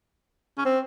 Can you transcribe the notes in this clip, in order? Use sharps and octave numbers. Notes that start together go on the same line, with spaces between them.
C#4
C4